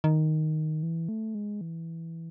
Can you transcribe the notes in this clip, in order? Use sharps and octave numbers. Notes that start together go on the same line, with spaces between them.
D#3
E3
A3
G#3
E3